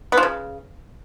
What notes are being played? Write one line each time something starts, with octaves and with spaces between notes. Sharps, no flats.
B3
F3
C#3